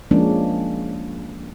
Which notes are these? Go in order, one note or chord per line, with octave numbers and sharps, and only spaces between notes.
F3 G#3 A#3 C#4 D4